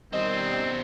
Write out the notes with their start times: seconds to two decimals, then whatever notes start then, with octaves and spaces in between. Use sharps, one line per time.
0.13 B2 D#3 G3 C4 C5 D#5